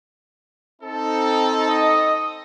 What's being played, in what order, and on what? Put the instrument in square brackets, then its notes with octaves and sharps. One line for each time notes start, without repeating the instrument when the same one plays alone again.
[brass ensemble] C4 D#4 A4
[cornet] D#5